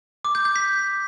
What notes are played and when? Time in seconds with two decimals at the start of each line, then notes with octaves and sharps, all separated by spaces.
0.25 D6
0.35 G6
0.45 G6
0.56 B6